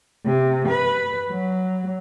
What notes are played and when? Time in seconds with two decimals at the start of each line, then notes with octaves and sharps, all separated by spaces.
0.24 C3
0.69 B4
1.29 F#3